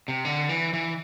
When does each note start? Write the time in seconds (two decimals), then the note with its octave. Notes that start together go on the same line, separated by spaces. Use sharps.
0.08 C3
0.25 D3
0.49 E3
0.73 E3